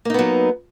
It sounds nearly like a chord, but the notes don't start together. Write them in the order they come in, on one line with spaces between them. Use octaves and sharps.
A#3 D#4 B3 F#3